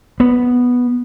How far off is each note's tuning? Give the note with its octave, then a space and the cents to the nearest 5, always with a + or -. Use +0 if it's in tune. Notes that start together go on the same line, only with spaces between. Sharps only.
B3 -5